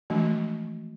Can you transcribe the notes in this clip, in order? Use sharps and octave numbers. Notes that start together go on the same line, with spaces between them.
E3 F3 G#3 A3 D4 F#4